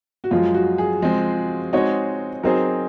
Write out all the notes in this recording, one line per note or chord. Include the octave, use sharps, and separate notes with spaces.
F#4
F#2 F3 G#3 F4
F#4
G#4
F3 G#3 C4
G#3 C4 D#4 F#4 C#5
F#3 C4 D#4 G#4 A#4 C5